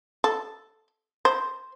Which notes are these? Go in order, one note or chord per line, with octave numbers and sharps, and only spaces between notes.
A4
C5